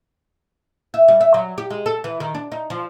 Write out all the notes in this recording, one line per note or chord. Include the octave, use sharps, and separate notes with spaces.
E5
G3
E5
F#3
G4
G#3
A4
E3
D#3
D4
D#4
F3